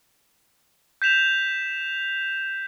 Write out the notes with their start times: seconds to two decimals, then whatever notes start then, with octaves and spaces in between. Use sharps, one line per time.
1.02 G6 B6 E7 F7